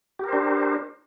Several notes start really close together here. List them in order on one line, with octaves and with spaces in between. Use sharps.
G4 A#4 C5 D4